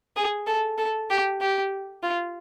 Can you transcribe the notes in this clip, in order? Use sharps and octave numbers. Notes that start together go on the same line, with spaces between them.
G#4
A4
A4
G4
G4
F4